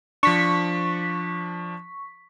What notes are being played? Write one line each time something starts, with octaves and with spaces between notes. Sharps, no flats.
F3 D4 C#6 B6